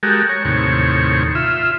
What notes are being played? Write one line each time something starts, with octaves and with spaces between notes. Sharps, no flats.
G#3 F#4 G4 A4 A#4
C#5
D#2 A2 C3 C#5
F4 E5